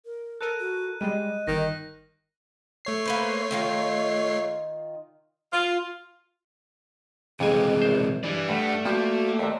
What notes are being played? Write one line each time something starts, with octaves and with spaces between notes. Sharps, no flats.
A#4
A4 A#4 F#6 D#7
F#4
G3 G#3 D#5 D#7
G1 D#3 A#6
A3 C#5 C7
A#3 B4 C5
D#3 D#4 F4
F4
F2 C3 E3 G#3 G#4 G#5
A#1 C5
E3 D4 G4 D5
G2 A3 F#5
G2 F3 A#3 F#4
D#2 C3 D5